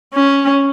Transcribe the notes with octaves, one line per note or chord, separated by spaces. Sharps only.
C#4